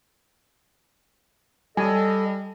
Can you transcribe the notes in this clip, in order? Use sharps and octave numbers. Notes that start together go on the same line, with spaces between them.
G3 A4 D#5 G#5